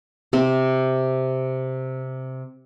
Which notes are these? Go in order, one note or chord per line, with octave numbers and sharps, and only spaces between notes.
C3 C4